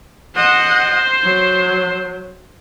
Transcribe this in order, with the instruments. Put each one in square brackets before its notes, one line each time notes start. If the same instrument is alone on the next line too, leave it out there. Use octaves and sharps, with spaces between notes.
[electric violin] C5 [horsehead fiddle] D#5 F#5
[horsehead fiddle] F#3